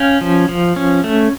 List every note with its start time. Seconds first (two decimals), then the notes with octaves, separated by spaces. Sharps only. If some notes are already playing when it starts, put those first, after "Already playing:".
Already playing: C#4 F5 G5
0.21 F3
0.49 F3
0.76 C#4
1.04 A3